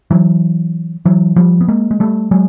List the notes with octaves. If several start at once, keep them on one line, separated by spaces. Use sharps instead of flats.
E3 F#3
E3 F#3
F3 G3
B3
G#3 A#3
G#3
G3 A3
F#3 G#3